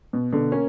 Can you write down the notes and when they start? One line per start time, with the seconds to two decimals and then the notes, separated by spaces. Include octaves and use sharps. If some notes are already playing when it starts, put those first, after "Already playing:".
0.13 B2
0.32 B2 D3
0.52 A#3 C#4